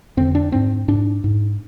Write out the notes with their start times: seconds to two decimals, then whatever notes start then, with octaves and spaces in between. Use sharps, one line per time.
0.17 F2 D3 C4
0.35 D4
0.52 G#2 C4
0.88 G#2 D4
1.24 G#2